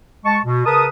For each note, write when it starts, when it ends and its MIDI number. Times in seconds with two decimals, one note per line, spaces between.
0.25 0.38 56
0.25 0.38 81
0.25 0.38 85
0.44 0.63 47
0.65 0.87 49
0.65 0.87 70
0.65 0.87 71
0.65 0.87 81
0.65 0.87 87